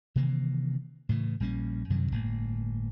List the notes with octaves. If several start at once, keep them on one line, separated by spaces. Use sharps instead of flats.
C3 D#3 E3 A#3
A2 C#3 E3
A#1 G3 A#3 C#4
F#2 C3 D#3 F#3
G1 A2 A#3